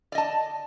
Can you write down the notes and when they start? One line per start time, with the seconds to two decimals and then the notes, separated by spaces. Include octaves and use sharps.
0.12 D5
0.15 D#5
0.18 A5